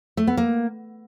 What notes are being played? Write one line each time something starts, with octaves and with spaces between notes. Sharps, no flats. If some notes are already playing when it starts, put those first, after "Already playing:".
A3
B3
A#3